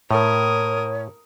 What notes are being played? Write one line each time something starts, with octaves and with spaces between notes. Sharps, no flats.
A2 A#4 C#5 D#6